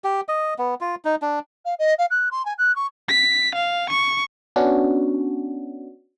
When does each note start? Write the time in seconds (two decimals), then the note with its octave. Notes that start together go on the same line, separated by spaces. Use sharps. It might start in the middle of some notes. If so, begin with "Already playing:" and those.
0.04 G4
0.28 D#5
0.58 B3
0.81 F4
1.05 D#4
1.22 D4
1.65 F5
1.78 D#5
1.98 F5
2.10 F#6
2.31 C6
2.45 G#5
2.58 F#6
2.75 C#6
3.09 B6
3.55 F5
3.90 C#6
4.56 B3 C#4 D4 F#4